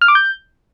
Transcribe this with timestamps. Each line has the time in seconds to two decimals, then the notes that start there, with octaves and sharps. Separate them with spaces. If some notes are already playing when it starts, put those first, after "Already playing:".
0.01 F6
0.08 D6
0.15 G6